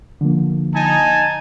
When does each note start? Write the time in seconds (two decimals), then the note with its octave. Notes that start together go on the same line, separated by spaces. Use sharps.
0.21 D3 F3 A#3
0.75 D#4 G#5 A5